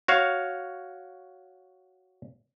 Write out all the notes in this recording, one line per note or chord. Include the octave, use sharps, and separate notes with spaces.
F#4 C#5 F5